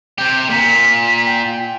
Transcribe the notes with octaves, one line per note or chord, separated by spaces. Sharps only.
C3 G4 G6
A#2 B6
G5